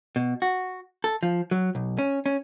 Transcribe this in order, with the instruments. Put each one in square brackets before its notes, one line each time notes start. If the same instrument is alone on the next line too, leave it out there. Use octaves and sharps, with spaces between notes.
[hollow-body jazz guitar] B2
F#4
A4
F3
F#3
B1
C#4
C#4